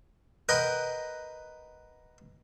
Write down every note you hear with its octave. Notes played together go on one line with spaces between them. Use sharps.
A#4 B4 D#5 F#5 G5